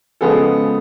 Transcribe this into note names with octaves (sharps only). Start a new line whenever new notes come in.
C#3 F3 G#3 B3 G#4 A4